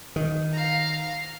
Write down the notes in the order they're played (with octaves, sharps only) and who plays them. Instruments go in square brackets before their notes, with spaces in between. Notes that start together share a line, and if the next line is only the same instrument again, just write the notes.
[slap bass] D#3
[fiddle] F5 A#5